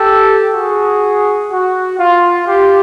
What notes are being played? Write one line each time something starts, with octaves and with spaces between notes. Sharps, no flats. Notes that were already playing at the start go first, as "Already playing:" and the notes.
Already playing: G4 A4
F#4 G#4
F#4
F4
F4 G4